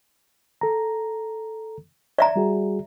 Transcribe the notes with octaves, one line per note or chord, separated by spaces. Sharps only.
A4 A#5
D5 E5 A#5
G3 F#4 G#4